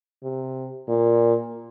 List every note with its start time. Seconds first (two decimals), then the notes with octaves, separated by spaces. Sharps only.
0.23 C3
0.88 A#2